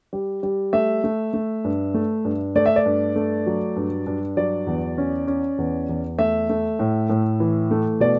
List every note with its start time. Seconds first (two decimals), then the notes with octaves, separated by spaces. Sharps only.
0.13 G3
0.43 G3
0.73 A3 E5
1.04 A3
1.34 A3
1.64 G2
1.94 A3
2.25 G2
2.56 A3 D5
2.66 E5
2.76 D5
2.86 G2
3.16 A3
3.47 F#3
3.76 G2
4.06 G2
4.37 F#3 D5
4.67 E2
4.98 C#4
5.27 C#4
5.58 E2
5.89 E2
6.19 A3 E5
6.49 A3
6.79 A2
7.10 A2
7.40 E3
7.71 A3
8.00 B2 D5